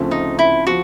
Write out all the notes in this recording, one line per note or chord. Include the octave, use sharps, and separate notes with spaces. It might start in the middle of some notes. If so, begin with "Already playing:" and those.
Already playing: D2 C#3 F3 A3 C4
D#4
E4
F3 F#4